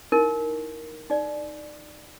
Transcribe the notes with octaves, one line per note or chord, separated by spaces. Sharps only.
D#4 E4 A#4
D#4 D5